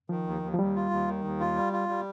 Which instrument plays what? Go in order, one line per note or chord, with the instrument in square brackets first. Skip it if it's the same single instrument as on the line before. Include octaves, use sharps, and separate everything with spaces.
[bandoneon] D#3 [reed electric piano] F3
[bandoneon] D#2
D#2
[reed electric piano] F3
[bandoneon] D#2 [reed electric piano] G3
[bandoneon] F4
D#2
D#3
D#2
F4
G3
F4
G3